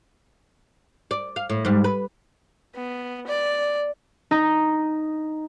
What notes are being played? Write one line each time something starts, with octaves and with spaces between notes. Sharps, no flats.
D5
F5
A2
G#2 G3
B4
B3
D5
D#4